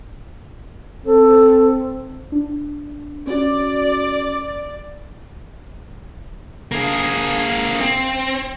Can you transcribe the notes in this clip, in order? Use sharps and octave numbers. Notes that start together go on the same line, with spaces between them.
C4 A4
D4
C#4 F#4 D5
A#3 G#4
C4